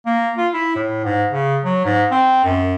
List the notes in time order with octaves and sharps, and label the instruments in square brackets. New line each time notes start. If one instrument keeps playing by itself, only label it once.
[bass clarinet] A#3
F4
E4
A2
G#2
C#3
F#3
G#2
C4
F#2